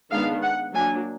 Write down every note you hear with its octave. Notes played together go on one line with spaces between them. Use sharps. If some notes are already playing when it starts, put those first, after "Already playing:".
D#3 G#3 B3 D4 F5
F#5
F#3 A#3 D4 G#5